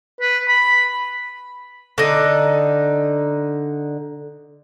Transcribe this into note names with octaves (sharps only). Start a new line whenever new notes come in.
B4
B5
D3 D#4